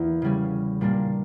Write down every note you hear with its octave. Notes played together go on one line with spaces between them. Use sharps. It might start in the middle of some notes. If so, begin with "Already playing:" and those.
Already playing: E2 E3 A#3 E4
C#3 G3 C#4
A#2 G3 A#3 D4